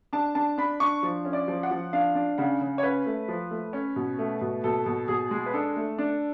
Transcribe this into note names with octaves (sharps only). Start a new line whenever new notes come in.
D4 A5
D4 A5
D4 B5
D4 C#6
F3
C#4
D5
F3
F#5
F3
D4 F5
D4
C#3 F#5
C#3
C#5
C#4 B4
A3
F3
A3
C#4
B2
A3
B2
B2 A4
B2
B2 G#4
G#3
B4
D4 A4
A3
D4